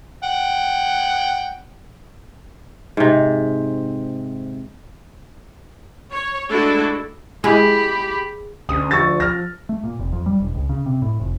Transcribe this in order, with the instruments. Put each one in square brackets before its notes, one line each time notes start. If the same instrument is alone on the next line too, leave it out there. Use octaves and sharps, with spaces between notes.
[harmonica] F#5 G5
[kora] G#2 C3
[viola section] C#5
G#3 A3 D4 E4 F#4 A4
[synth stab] G#3 E4 [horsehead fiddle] G4 B5 [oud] G#4
[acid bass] D2 [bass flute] C#4 [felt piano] D#6
[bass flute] F3 [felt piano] C#6 E6 A6
[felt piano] F6 A#6
[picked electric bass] A3
A#2
F1
F2
G3
E1
C#2
C#3
C3
A2
F1